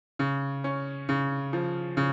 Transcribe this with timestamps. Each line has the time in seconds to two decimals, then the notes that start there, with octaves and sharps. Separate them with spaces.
0.19 C#3
0.64 C#4
1.09 C#3
1.53 F3
1.97 C#3